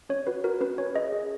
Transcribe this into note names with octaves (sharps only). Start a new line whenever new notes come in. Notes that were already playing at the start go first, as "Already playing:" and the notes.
C#4 C#5
F#4 B4
F#4 A#4
C#4 B4
C#4 C#5
G#4 D#5
G#4